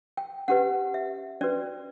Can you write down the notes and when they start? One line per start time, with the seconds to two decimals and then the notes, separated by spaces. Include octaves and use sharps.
0.17 G5
0.48 C#4 G4 B4 F#5
0.94 E5
1.41 C#4 F#4 B4 D5